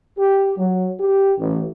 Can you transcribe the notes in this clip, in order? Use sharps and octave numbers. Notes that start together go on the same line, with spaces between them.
G4
F#3
G4
A1